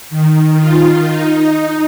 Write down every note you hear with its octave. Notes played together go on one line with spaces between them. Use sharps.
D#3
F4
D#4